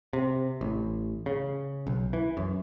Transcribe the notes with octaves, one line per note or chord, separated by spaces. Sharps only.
C3
A1
C#3
B1
E3
F#2